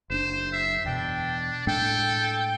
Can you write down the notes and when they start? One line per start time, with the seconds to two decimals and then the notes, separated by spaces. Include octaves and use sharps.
0.10 F#1 C#4 D4 C5 E7
0.53 E5 C7
0.85 E2 B2 D4 G5
1.67 A2 G#3 D4 A4 G5